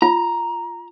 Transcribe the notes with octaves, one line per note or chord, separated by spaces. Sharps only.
F4 A#5